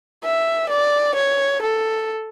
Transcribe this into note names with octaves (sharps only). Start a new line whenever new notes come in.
E5
D5
C#5
A4